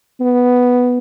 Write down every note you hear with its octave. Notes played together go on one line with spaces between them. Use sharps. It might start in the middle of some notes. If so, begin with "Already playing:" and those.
B3